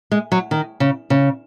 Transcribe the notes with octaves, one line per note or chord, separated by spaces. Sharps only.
G#3
F#3
D#3
C#3
C#3